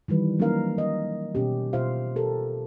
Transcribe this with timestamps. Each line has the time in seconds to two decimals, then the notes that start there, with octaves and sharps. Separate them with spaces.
0.08 D#3 E3 G3 B4
0.39 F#3 A#3 C#4 D#4 A#4 F5
0.78 D#5
1.35 B2 C#4 G4
1.73 B2 F4 C5 E5 F5
2.16 G4 A4 A#4